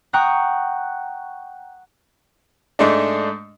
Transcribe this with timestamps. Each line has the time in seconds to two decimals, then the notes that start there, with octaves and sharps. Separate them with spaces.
0.13 F#5 G5 A#5 C#6 D#6 F#6
2.79 G#2 G#3 A3 D4